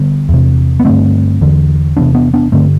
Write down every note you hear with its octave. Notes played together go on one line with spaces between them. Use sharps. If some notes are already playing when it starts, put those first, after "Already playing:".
Already playing: D3 G3 B3
E2 C3
B3
G2 D3 A3 C4
E2 D3
E2 C3 B3 D4
B3 D4
B3 D4
G2 D3 A3 C4